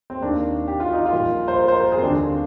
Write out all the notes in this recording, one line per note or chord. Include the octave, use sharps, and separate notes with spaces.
C4
D#2 D#3 A#3 D4
G4
F4
D#4
F4
A#1 A#2 G3 A#3
C5
A#4
C5
A#4
G#4
C4
D#2 D3 G3 A#3 D4